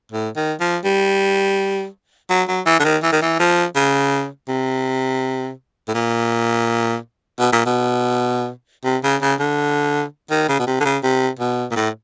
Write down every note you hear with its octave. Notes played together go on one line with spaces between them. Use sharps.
A2
D#3
F3
G3
F#3
F#3
E3
D3
D#3
E3
D#3
E3
F3
C#3
C3
A2
A#2
B2
A#2
B2
C3
C#3
C#3
D3
D#3
C#3
B2
C3
D3
C#3
C3
B2
A#2
A2